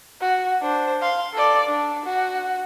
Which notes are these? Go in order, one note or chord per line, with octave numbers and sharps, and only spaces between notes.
F#4
D4 C5
F5 C6
A4 D5
D4
F#4